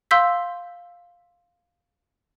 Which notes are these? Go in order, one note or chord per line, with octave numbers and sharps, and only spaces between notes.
F5 C6 E6 G6 B6